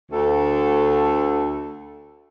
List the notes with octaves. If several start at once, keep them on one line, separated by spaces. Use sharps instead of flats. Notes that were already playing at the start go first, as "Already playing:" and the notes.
D2 A4